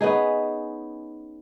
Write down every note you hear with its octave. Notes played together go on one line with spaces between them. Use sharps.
B3 C#4 D#4 G#4